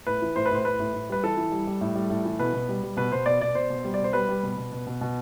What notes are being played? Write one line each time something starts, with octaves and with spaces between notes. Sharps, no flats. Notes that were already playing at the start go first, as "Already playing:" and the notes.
A2 B4
E3
A2 C5
B4
A2 C5
A2 B4
A2
A2
G3 B4
E3 A4
E3
G3
G3
A2
G3
A2
E3
B2 B4
B2
G3
G3
B2 B4
B2 C5
B2 D5
B2 D5
B2 C5
B2
G3
D5
B2
C5
G3 B4
G3
B2
B2
B2
B2
B2